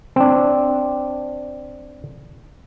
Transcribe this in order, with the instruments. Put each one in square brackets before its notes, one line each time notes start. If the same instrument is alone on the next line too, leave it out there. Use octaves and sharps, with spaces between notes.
[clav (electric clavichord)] C4 D4